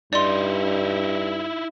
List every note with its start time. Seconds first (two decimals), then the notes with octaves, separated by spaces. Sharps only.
0.13 G2 D#4 E4 D5 C6